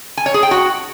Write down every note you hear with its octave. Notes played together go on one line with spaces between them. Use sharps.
G#5
C#5
G#4
G5
F#4